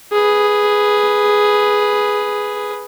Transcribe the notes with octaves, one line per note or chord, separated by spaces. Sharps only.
G#4 B4